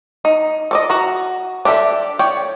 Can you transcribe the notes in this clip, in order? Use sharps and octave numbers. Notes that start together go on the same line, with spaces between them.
D#4
A4 D5 D#5
F#4 A#5
D4 G4 A4 E5
C#5 D5 G5